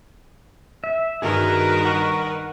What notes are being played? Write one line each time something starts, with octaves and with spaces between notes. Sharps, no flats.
E5
G2 D#3 F#4 G#4 A#4 B4
F#5 C#6